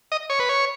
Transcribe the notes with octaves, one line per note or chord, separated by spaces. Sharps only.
D#5
C#5
B4
C#5